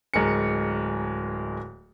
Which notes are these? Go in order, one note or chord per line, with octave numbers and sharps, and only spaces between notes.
D1 G#3 A#4 G#5 C#7